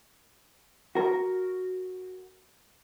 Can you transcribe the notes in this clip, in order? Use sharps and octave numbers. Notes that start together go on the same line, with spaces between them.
F#4 A#4